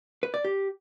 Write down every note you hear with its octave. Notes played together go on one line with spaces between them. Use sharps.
B4
D5
G4